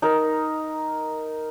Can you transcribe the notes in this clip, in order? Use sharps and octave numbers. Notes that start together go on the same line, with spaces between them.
D#4 A#4